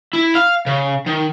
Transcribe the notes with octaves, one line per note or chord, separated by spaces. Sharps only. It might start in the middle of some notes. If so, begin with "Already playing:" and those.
E4
F5
C#3
D#3